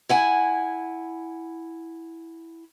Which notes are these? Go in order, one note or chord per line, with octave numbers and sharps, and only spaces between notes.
E4 F#5 G#5